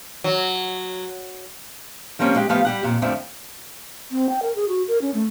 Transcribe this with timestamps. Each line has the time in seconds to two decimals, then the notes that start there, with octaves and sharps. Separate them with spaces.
0.24 F#3
2.19 F3 G3 A#3 C4 C#4
2.36 G#3 G4
2.49 F3 A3 B3 F4 G4 F5
2.65 G3 G4 F#5
2.83 F2 A#2
3.02 F2 D3 F3 A3 C4
4.11 C4
4.29 G5
4.42 A#4
4.55 G#4
4.68 F#4
4.88 A#4
5.02 C#4
5.14 A3